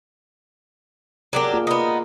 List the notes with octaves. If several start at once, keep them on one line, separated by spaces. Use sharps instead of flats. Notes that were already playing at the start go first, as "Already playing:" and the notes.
F#3 D4 G4 G#4 A#4
A#3 F4 G#4
B3 D#4